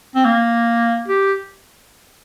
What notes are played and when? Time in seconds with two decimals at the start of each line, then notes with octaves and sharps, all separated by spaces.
0.15 C4
0.25 A#3
1.08 G4